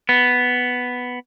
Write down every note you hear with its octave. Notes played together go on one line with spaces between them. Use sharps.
B3